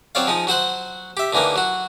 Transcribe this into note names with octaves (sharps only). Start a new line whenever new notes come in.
F#3 C4 C#5 D5 F5
F3 G#3 D#4
F#3 F#4 C5 F#5
G4 E5
A2 D3 E3 A#3 D#4
F#3 F#4